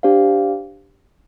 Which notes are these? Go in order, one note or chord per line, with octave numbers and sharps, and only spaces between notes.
D4 G4 C5 F5